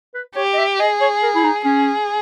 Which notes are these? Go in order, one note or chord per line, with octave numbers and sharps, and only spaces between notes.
B4
G4 C#5
D#5
E5
G#4 D#5
C#5
A#4
E4
D#4
C#4 G#4